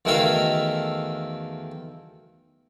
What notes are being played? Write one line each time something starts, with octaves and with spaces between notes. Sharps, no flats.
E2 D#3 A3 F#4 E5 F5